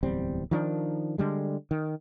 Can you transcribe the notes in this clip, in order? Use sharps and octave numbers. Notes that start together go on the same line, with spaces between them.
D1 E2 G3 C4
D#3 F3 D4
D3 G3 G#3
D#3